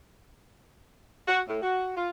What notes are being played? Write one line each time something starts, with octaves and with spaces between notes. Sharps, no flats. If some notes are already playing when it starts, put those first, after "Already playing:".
F#4
A2
F#4
F4